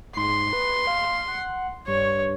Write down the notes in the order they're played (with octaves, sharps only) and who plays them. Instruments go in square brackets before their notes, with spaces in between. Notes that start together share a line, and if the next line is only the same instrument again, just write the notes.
[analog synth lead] G#2 [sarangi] C6
[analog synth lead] B4
F5
F#5
[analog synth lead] G2 [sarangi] C#5